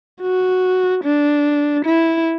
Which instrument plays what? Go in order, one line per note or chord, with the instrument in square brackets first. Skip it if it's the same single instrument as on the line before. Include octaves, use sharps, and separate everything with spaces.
[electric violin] F#4
D4
E4